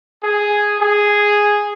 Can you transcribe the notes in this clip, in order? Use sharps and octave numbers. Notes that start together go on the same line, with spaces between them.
G#4
G#4